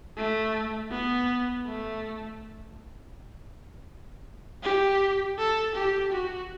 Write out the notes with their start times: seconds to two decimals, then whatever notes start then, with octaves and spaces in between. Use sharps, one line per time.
0.17 A3
0.91 B3
1.66 A3
4.63 G4
5.38 A4
5.76 G4
6.12 F#4